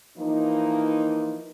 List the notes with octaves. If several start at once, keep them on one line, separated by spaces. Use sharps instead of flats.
E3 F3 A#3 D#4